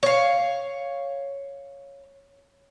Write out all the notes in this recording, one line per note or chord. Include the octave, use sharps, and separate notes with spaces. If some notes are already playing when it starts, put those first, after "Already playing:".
C#5 F5